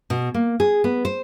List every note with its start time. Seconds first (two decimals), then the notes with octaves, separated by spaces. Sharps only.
0.10 B2
0.34 A#3
0.60 G#4
0.84 B3
1.05 C5